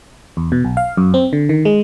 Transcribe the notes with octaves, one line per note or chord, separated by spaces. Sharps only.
E2
B2
B1
F5
F#2
C4
D3
D#3
G#3